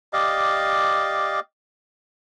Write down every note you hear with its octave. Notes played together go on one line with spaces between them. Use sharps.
G4 D5 D#5 F5